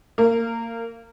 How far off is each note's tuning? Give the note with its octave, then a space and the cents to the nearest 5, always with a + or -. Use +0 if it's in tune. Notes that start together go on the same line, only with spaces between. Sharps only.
A#3 -25